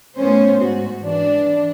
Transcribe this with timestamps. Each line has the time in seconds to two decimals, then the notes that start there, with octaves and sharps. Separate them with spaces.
0.16 A2 B3 C#4 C5
0.63 G#2 F#4
1.01 E3 D4